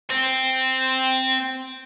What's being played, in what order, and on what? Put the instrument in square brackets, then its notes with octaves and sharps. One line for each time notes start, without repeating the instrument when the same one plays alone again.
[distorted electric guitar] C4